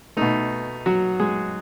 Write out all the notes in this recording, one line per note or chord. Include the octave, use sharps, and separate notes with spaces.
B2 A3 D#4
F#3 F#4
G#3 G#4